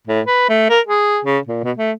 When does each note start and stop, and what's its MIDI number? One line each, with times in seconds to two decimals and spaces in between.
0.08 0.21 45
0.26 0.48 71
0.49 0.70 57
0.70 0.81 70
0.87 1.20 68
1.25 1.39 49
1.48 1.61 46
1.64 1.72 47
1.77 1.92 57